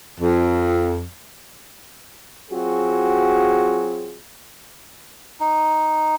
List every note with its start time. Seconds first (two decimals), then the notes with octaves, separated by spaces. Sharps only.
0.20 F2
2.51 F#3 C4 F4 F#4 G#4
5.40 D#4